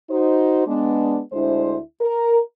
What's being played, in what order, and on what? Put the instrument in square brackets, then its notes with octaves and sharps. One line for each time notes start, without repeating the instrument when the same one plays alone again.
[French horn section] D#4 F#4 C5
G#3 B3 D4
D2 G#3 D4 E4 C5
A#4